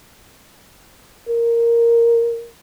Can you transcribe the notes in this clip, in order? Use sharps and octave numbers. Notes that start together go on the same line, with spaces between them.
A#4